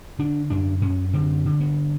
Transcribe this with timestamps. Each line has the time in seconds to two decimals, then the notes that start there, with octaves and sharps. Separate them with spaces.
0.19 D3 D4
0.50 F#2 D4
0.81 F#2 C#4
1.13 D3 C4
1.45 D3
1.60 B3